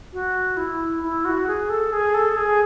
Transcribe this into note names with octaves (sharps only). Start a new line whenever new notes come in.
F#4
E4
E4
F#4
G#4
A4
G#4
A4
G#4